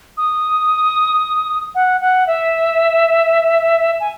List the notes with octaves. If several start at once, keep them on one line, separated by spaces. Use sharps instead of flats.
D#6
F#5
F#5
E5
G#5